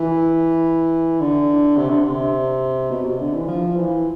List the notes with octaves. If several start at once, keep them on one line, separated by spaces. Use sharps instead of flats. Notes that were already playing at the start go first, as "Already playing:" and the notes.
Already playing: E3
D3
C3
D3
C3
B2
C3
D3
E3
F3
E3